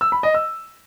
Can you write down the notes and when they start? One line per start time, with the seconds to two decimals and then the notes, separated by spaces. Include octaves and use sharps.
0.01 E6
0.12 B5
0.23 D#5
0.34 E6